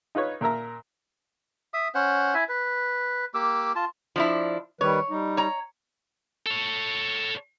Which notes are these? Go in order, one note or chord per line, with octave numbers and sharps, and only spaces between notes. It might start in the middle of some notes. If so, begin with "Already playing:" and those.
D#4 F4 B4 C#5
A#2 A#4 E5 A#5
E5 D#6
C#4 C5 F#5
E4 E5 G#5
B4
A#3 G4 D6 E6
F4 A5
F3 D4 E4
D#3 G3 B4 C#5
G3 D#4
C#5 A#5
A4 C#5